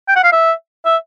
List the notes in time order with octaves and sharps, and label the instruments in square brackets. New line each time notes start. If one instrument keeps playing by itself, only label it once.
[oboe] G5
F#5
F5
E5
E5